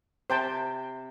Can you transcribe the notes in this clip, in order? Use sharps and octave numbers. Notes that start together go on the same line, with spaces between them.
C3 C5 G5 A5